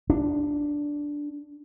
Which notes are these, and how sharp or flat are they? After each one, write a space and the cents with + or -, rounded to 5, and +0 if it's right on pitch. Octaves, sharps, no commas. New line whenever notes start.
D4 -5